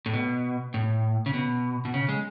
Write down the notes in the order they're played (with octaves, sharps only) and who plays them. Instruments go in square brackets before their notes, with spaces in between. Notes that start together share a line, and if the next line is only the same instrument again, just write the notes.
[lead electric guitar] A2
B2
A2
C#3
B2
B2
C#3
G#3